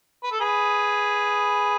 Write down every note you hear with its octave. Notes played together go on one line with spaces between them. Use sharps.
B4
A4
G#4 B4